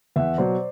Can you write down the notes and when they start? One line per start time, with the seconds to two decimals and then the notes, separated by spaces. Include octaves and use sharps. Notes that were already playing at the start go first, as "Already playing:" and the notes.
0.16 E2 E5 F#5
0.38 B2 F#3 C5 D5